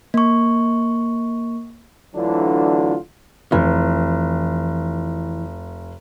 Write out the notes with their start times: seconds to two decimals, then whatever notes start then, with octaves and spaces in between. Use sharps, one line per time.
0.14 A#3 C#6
2.15 D2 D3 E3 F#3 D4 F4
3.52 F1 E3